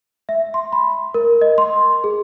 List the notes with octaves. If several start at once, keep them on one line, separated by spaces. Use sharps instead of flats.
E5
C6
B5
A#4
D#5
C6
G#4